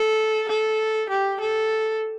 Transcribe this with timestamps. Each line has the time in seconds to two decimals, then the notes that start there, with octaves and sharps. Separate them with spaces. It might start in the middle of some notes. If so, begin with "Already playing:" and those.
Already playing: A4
0.49 A4
1.09 G4
1.41 A4